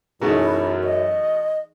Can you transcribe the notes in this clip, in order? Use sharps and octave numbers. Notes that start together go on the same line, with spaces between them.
F#2 B2 E3 A3 D#4 E4 G#4 A#5
D#5